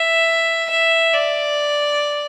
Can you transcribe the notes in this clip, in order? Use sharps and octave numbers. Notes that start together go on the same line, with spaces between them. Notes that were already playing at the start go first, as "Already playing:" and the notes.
Already playing: E5
E5
D5